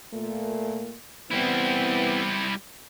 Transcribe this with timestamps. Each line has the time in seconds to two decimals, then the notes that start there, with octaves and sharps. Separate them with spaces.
0.14 A#2 A3 A#3
1.31 E3 G3 B3 C4 E4